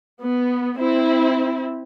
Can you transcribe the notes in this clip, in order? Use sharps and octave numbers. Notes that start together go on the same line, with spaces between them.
B3
C4 E4